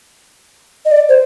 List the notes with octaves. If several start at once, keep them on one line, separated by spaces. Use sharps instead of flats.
D#5
D5
C5